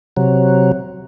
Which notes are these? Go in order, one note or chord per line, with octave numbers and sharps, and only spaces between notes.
C3 F#3